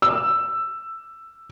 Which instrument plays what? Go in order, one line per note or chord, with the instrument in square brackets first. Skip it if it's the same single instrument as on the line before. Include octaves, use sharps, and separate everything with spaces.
[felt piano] E6